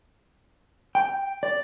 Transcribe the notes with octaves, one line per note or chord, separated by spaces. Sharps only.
G5
D5